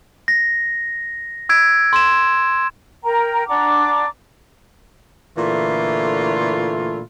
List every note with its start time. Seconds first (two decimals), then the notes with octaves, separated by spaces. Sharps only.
0.28 A#6
1.49 E6 G#6 D7
1.93 C6 E7
3.03 A#4 G5 A#5
3.48 D4 F#5 A#5 D6
5.37 A#2 D3 E3 A3 E4 F4